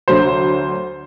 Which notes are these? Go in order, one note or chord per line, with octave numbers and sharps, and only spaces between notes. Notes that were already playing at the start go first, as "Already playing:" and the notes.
D2 D3 F#3 C5